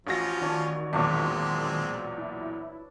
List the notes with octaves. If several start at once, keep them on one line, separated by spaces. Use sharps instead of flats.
A1 F3 C#4 F4 F#4 A#6
D#3 D4 C#5
B1 E2 A#2 G#3 C4 D4 B4 C#5
E4